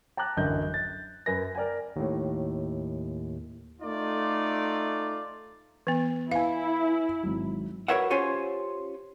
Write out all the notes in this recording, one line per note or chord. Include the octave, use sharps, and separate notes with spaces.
G5 A5 A#5 D6 F#6
D1 A1 F#2 D3 D#5 G6
A6
F#2 B4 G#5 A#6
A#4 D5 G5 G#5
D#2 A2
A3 D#4 F4 D5
E3 B3
E4 B4 E5 F5 G#5
G#1 F#3
F#4 A#4 B4 C#5 E5 F#5
C#4 F4 G4 C5 C#5 G#5